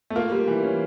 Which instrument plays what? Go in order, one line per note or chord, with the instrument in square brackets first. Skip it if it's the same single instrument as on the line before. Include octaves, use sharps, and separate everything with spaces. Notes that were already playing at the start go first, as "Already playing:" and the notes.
[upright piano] A3
[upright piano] A#3 [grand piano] F4
[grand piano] G3
E3
C#4